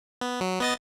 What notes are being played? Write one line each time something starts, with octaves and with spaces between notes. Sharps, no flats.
B3
F#3
B3 D#5 A6